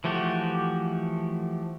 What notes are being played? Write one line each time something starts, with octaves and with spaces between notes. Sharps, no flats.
E3 F3 A3 F#4 G4